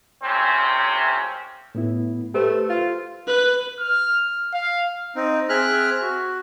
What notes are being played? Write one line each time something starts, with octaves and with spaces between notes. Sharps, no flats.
A#1 A2 C3 C4 C#4 C5
A2 B3 E4
A3 G4 B4 C5
F4
B4
F6
F5
C4 D#4
C4 G#4 E5 F6 F#6
F#4